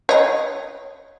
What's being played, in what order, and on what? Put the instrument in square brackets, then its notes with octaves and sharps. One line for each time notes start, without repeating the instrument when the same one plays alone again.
[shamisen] C#5 D#5